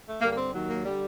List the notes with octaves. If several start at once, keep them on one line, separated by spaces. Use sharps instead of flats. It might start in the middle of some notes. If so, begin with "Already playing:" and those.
A3
G2 D3 G3 A#3
A#3
C4
D#2 D#3 F#3
A#3
D3 G3